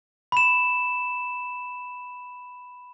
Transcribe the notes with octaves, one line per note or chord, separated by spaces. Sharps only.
B5 E7